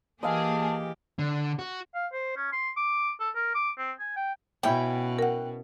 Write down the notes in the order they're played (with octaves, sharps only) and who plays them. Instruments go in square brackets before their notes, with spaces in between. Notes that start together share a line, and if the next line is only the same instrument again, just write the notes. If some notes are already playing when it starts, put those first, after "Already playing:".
[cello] E3 G4 [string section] A#3 G#4 [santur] D#5 F5 E6 [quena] A5
[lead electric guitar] D3
F#4
[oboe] F5
C5
C#4
C6
D6
A4
A#4
D6
C4
G#5
G5
[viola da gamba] B2 [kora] C#4 E4 [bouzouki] G5
[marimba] A#4 F#5